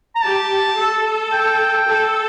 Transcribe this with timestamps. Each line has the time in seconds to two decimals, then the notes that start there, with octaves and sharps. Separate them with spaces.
0.15 A#5
0.23 G4 A5
0.77 A4
1.32 G5
1.87 A4